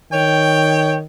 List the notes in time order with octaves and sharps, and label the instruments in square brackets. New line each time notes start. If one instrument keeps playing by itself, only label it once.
[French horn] D#3 [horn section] C#5 G5